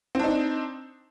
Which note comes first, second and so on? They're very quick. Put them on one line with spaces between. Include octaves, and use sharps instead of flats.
C4 D4 D#4